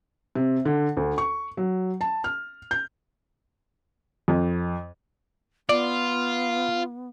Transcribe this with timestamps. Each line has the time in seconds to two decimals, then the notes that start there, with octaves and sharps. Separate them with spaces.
0.35 C3
0.65 D3
0.97 D2
1.18 C#6
1.57 F#3
2.01 A5
2.24 F6
2.71 G6
4.28 F2
5.69 B3 F4 D5